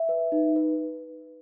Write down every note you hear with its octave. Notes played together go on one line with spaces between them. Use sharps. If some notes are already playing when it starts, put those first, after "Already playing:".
Already playing: E5
B4
D#4
B4